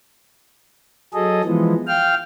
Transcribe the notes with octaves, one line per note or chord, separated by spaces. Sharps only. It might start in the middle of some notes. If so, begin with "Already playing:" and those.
F#3 G#4 A4 D#5
E3 F3 G#3 B3
F5 G5 F6